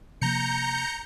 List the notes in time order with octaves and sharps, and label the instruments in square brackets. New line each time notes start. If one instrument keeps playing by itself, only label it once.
[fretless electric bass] C3 F3 A#3 [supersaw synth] A#5 G6 C#7